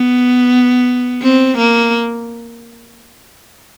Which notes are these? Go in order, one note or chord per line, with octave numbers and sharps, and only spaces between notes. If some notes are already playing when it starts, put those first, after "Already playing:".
Already playing: B3
C4
A#3